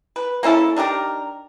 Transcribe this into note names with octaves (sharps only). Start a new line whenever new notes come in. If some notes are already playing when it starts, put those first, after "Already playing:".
B4
A#3 C#4 E4 A4
D4 D#4 G4 A#4